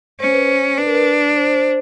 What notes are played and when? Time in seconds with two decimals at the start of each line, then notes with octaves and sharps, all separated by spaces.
0.20 C#4 C5
0.33 B4
0.46 C5
0.78 D4 B4
0.86 A#4
0.95 B4
1.36 C5